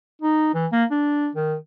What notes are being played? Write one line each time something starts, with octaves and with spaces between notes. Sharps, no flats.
D#4
E3
A#3
D4
D#3